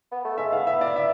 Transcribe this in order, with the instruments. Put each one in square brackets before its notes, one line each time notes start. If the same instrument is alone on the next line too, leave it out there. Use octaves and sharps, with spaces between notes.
[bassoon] B3
A3
[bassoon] G#3 [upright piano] E5
[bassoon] B3 [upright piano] F5
[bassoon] B3 [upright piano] E5
[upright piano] D5
E5